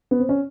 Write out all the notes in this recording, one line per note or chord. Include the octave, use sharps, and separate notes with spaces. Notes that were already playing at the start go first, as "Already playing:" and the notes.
B3
C4
C#4